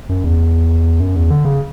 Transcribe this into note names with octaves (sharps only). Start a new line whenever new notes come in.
F#2
E2
F#2
E2
D3
C#3